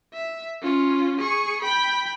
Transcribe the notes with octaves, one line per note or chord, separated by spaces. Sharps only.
E5
C#4 F4
G#4 C#6
G5 B5